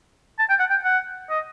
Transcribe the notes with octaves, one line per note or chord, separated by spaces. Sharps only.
A5
G5
F#5
G5
F#5
D#5